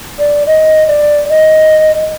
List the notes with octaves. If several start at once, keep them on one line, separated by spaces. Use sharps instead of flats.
D5
D#5
D5
D#5